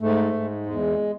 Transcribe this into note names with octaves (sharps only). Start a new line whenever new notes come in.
G#2 A3
G#2
E2 G#3